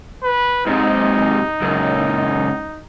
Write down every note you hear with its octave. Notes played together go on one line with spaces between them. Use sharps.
B4
G#2 C3 D#4
C#2 F#2